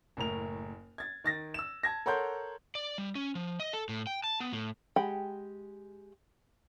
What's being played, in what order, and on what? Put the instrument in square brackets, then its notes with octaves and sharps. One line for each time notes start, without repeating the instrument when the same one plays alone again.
[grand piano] F#1 A2 A#4 F7
G#6 A6
D#3 A6 A#6
E6 E7
A5 G#6 A#6
A4 A#4 C#5 F#5 C6 G6
[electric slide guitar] D5
G3
C#4
F3
D#5
A4
A2
G5
A5
B3
A2
[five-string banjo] G#3 G4 F#5 G5 B5